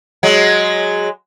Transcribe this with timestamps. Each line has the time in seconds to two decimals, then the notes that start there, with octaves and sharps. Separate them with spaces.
0.23 F#3 G#3